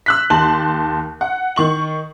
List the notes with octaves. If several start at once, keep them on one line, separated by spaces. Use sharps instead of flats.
E6 F#6 B6
D#2 A5 C6 F#7
F#5
D#3 C#6 F#7